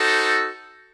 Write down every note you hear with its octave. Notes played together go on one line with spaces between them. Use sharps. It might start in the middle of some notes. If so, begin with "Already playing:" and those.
Already playing: D#4 F#4 A4 C5